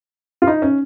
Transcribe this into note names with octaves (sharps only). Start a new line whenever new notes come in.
F4
D#4
C#4